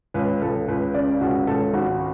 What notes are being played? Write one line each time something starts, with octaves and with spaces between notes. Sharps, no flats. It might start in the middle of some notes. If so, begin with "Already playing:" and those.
C#2 B4
C#2 A4
C#2 B4
C#3 D5
C#2 F#4
C#2 A4
G#1 F#4